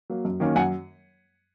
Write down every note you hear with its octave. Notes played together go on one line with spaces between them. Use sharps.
F#3 A#3
F#2
D#3 F#3 A#3 C#4
F#2 F#5 G#5